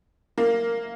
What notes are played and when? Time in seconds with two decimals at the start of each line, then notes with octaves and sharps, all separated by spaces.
0.38 A#3